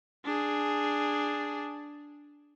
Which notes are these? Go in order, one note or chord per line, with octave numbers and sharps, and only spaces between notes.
D4 G#4